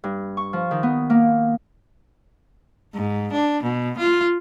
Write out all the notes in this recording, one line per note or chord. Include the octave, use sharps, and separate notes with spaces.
G2
C#6
F3
D#3
B3
A#3
G#2
D4
B2
F4